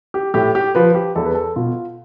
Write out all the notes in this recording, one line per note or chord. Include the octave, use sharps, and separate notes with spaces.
G4
A2 G4
G4
F3 B4
G4
E2 A4
B4
A4
B2 F4